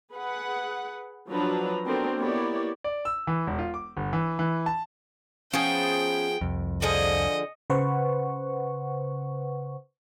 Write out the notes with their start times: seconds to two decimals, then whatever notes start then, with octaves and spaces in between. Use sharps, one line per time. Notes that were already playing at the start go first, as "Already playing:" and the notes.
0.12 G#4 B4 F#5
1.28 F3 F#3 D4 B4 A#5
1.86 B3 C4 D4 F#4 A4 A#4
2.18 A#3 B3 E4 G4 C#5 D5
2.84 D5
3.05 E6
3.27 E3
3.47 E1
3.59 F4
3.74 D6
3.97 G1
4.13 E3
4.39 E3
4.66 A5
5.53 F3 B3 C#4 G#4 G5
6.41 C2 F2
6.82 D3 F3 G#4 D#5
7.70 C#3 B4 C5 F#5 C#6